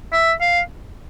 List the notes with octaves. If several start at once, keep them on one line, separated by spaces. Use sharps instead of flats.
E5
F5